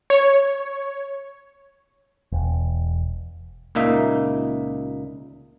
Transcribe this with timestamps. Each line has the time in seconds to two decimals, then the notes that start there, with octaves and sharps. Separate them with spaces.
0.10 C#5
2.32 E1
3.75 C#2 A#2 A#3 D#4 E5